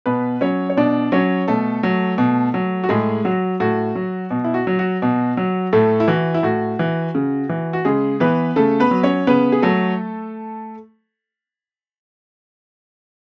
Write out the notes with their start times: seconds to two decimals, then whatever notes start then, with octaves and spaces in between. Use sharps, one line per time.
0.06 B2 B3 B4
0.41 F#3 C#4 C#5
0.70 C#5
0.77 B2 D4 D5
1.12 F#3 C#4 C#5
1.48 B2 A3 A4
1.83 F#3
2.18 B2
2.54 F#3
2.84 F#4
2.89 A2 G#3 G#4
3.25 F#3 F#4
3.60 A2 F#4
3.95 F#3
4.31 B2
4.44 E4
4.54 F#4
4.67 F#3
4.79 F#4
5.02 B2
5.37 F#3
5.73 A2 A3 A4
6.00 E4
6.08 E3 F#4
6.34 E4
6.43 A2 F#4
6.79 E3
7.15 C#3
7.49 E3
7.73 F#4
7.85 C#3 G#3 G#4
8.20 E3 B3 B4
8.56 C#3 A3 A4
8.80 B3 B4
8.91 F#3
9.03 C#4 C#5
9.27 C#3 B3 B4
9.52 G#4
9.62 F#3 A3 A4